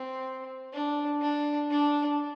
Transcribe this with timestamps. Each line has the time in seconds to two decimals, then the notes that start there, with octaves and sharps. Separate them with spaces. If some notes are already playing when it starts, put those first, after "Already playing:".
Already playing: C4
0.73 D4
1.21 D4
1.70 D4